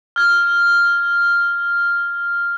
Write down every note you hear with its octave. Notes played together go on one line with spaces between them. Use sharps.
F6 G#6